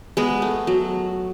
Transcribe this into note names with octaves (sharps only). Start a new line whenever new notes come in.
G#3 B3
A3
F#3